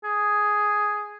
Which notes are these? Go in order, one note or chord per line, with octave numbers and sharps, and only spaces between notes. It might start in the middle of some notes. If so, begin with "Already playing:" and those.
G#4